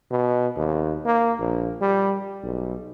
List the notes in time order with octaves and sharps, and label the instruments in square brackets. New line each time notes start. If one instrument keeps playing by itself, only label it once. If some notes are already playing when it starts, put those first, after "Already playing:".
[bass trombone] B2
D#2
A#3
A#1
G3
B1